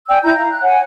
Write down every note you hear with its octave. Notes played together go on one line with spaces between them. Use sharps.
D5 G5 G#5 E6
E4 A#5 G6
F5 A#5
F#6
C#5 F#5 G#5